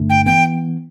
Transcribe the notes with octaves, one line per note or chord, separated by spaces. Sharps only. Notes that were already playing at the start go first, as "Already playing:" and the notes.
Already playing: G1 G2 D3 A3 D4
G5
E3 B3 G5